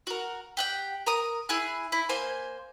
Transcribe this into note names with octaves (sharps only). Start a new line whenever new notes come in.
F#4 A#4
G4 F#5 G5
A#4 A#5 D#6
E4 G#4 G#5 F#6
E4
A#3 C5 G#5 C6